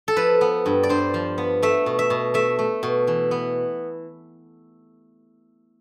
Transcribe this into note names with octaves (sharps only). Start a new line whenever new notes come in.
A4
F3 B4
B3
G2
D5
G2 C5
F3
B3
A3 E5
B2
E5
B2
A3 E5
A3
B2
E3
B3